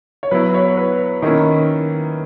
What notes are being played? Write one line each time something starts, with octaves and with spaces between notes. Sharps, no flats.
C#5
F#3 B3 E4 B4
C#5
B4
D#3 A#3 C#4 E4